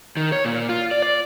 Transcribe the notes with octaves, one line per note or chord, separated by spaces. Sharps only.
D#3
C#5
A#2
F4
D5
D5